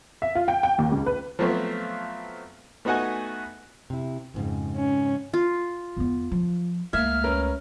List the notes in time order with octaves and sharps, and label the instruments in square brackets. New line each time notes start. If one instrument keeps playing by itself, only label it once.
[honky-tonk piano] E5
F4
G5
G5
D#2
C#2
B4
[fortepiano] F3 F#3 A3 B3 C4 F4
A3 B3 D#4 F#4 F#5 G#5
[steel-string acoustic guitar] C3 E4
F2 G#2 C#3
[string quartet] C#4
[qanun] F4
[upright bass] E2 B3
F3
[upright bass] C#2 A3 [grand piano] A#3 G#6 [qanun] E5 [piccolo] F6
[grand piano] C#4 A#4 B4